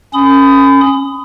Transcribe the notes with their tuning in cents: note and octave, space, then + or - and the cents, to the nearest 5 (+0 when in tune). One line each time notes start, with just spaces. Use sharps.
C#4 -10 B5 +35 D#6 +0